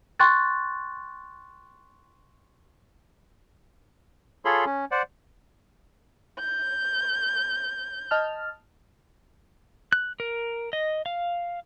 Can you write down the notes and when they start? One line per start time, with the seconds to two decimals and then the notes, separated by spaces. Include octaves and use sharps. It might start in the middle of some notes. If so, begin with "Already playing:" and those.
0.19 G5 C6 C#6 F#6 A6
4.45 F4 G#4 A4 C#5 B5 C6
4.66 C#4
4.91 C5 D5 F#5
6.40 G6
8.11 D#5 A5 F6
9.93 F#6
10.20 A#4
10.73 D#5
11.06 F5